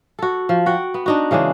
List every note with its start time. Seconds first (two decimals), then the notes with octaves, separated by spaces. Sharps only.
0.19 F#4 A4
0.49 F3
0.66 F#4 F#5 G5
0.94 B3
1.06 D4 D#4 F#4
1.31 C#3 E3 G#3 D4